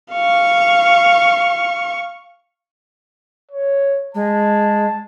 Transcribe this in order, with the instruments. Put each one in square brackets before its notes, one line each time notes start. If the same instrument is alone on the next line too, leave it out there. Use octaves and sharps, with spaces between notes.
[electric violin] F5 C#6
[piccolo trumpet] C#5
[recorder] G#3 [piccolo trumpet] A5